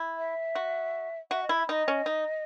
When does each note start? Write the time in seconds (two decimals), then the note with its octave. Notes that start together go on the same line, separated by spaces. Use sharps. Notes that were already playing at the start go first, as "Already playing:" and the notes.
Already playing: E4
0.18 E5
0.55 F#4
1.31 F#4 E5
1.43 D#5
1.49 E4
1.55 E5
1.68 D#4 D#5
1.88 C#4
2.06 D#4